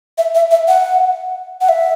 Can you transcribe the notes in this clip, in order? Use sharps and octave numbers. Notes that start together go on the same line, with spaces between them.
E5
E5
E5
F#5
F#5
E5